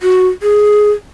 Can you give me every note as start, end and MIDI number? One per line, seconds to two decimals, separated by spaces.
0.03 0.27 66
0.43 0.91 68